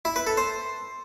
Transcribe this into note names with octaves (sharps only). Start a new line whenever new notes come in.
E4
B4
A4
C5